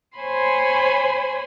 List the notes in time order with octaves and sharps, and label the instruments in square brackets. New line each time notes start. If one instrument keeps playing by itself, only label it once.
[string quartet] C5 C#5 G#5 B5 C6